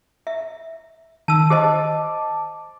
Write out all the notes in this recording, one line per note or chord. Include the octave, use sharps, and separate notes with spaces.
E5
D#3 A5 E6
G4 C5 D#5 A5 D6